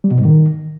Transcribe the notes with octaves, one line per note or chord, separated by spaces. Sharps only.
G3
B2
G#2
D#3